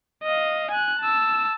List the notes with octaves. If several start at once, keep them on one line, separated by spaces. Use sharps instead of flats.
D#5 F5
G#5 F#6
A5 E6